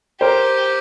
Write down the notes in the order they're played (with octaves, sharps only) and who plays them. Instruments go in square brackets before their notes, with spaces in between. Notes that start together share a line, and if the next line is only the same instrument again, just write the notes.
[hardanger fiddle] G4 [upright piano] A#4 C5